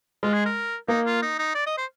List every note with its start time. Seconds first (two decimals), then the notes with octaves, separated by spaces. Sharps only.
0.23 G#3 F4
0.33 G#4
0.45 A#4
0.88 A#3 D#4
1.06 F4
1.22 D#4
1.38 D#4
1.55 D5
1.66 D#5
1.78 C5